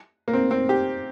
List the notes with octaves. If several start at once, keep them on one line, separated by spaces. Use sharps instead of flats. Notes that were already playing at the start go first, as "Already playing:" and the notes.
A#3
C4
C4
G4